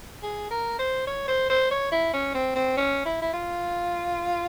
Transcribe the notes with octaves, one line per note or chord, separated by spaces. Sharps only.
G#4
A#4
C5
C#5
C5
C5
C#5
E4
C#4
C4
C4
C#4
E4
E4
F4